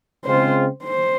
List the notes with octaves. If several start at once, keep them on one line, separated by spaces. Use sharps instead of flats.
C#3 G#3 C4 F4 C5
C5